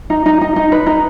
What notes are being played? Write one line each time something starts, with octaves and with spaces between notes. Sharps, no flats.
D#4
D#4
D#4
D#4
B4
D#4